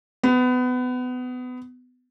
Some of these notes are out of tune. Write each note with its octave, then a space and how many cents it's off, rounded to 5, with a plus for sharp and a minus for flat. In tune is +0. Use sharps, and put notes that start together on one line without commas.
B3 +25